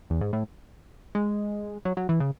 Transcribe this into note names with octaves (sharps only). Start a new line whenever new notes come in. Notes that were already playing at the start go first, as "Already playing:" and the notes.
E2
G#2
A2
G#3
F#3
F#3
E3
C#3